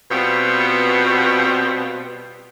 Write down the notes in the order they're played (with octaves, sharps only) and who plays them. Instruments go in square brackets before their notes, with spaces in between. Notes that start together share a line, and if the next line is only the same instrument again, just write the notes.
[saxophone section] B2 G3 B3 C4 F4